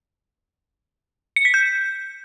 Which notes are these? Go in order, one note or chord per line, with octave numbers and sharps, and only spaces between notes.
C#7
B6
G6